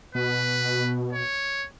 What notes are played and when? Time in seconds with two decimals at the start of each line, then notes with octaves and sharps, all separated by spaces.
0.15 B2 B4
1.13 C#5